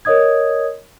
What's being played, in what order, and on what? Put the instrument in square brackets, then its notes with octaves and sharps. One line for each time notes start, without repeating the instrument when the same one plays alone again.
[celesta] A#4 C#5 D#5 D#6 G#6